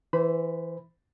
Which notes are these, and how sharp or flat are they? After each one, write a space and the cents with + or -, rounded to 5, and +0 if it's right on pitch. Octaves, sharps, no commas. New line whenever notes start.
E3 +0 C5 -25 B5 +0